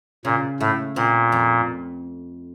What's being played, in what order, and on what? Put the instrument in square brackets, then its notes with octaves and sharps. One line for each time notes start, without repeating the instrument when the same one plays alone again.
[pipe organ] A#2 [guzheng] C#3
[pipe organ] A2 [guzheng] A3
[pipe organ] A#2 [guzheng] C4
[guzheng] F2